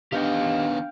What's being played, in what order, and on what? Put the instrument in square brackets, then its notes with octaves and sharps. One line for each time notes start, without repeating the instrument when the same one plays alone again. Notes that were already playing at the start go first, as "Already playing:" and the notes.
[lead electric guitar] D#3 B3 [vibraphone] D4 [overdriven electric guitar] G4 D#5 [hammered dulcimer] F5 G5